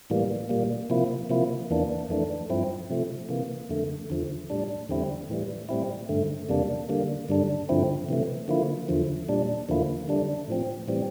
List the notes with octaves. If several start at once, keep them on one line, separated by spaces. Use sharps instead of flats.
A2 E3 G3 A#3
A#2 G3 A#3
C3 F3 A#3 E4
C3 F3 A#3 E4
E2 E3 A#3 D4
F2 E3 A3 D4
G2 F3 C4 E4
C3 F3 A3
C3 E3 A#3
F2 D3 A3
E2 D3 F3
A2 G3 D4
E2 D3 G3 C4 E4
A2 E3 G3
A2 G3 C4 E4
G2 D3 A3
E2 C3 G3 A#3 D4
D3 G3 A#3
G2 D3 G3 D4
G2 D3 F3 C4 E4
C3 E3 A3
D3 F3 A#3 E4
E2 D3 F3
A#2 G3 D4
E2 D3 F3 A#3 E4
D3 G3 D4
A2 F3 C4
A2 E3 G3 C4